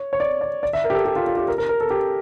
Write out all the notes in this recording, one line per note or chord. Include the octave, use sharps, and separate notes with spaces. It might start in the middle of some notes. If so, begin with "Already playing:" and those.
Already playing: C#5
C#5
D5
D5
D5
E5
A#4
G4
A4
G4
F4
F4
G4
A#4
A#4
A#4
A4
G4